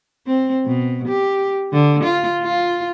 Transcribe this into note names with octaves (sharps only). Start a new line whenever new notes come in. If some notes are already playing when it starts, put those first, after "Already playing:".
C4
B2
G4
D3
F4
F4